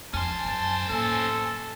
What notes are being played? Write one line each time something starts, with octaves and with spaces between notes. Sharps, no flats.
F2 C#4 C5 G#5 A5
F#2 A5
A2 A#3 A4